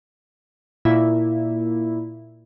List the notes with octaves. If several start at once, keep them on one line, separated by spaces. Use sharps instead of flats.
A#2 E4